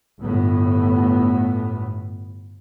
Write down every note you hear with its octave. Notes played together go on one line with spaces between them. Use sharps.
G1 A2 B3